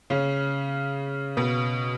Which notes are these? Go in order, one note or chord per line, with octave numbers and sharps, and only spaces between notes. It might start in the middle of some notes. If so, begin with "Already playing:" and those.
C#3 C#4
B2 B3